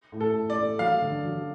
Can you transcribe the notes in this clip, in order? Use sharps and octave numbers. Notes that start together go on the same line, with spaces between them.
A2
A4
A2
D5
A3
F#3 F5
D3
F#3